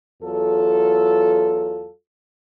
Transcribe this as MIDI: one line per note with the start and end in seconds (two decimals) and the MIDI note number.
0.22 1.89 40
0.22 1.89 54
0.22 1.89 65
0.22 1.89 69